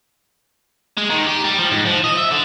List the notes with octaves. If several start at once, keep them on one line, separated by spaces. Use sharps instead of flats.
G#3
D#3
G4
G3
F3
G#2
F3
D#5
E5
D3